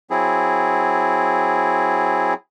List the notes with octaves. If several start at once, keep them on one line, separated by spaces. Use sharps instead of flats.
F#3 C4 E4 G#4